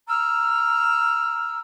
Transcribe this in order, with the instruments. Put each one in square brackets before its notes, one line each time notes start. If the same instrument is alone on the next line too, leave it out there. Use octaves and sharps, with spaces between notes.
[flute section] A#5 E6 F6